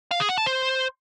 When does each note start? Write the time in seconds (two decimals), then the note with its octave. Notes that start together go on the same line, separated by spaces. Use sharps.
0.11 F5
0.20 G#4
0.29 F#5
0.38 A5
0.46 C5